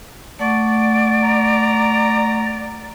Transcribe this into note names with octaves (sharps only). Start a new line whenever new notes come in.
A3 D5 F#5 C#6
A#5